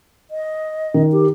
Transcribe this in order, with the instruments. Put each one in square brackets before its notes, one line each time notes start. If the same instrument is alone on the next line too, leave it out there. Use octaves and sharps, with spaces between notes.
[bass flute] D#5
[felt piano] D#3
[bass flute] G4